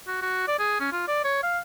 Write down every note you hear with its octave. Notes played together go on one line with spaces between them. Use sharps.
F#4
F#4
D5
G#4
C#4
F4
D5
C#5
F5